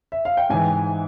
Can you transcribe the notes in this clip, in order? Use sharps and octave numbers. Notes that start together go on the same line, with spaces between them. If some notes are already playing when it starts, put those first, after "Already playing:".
E5
F5
G5
G#2 E3 G#5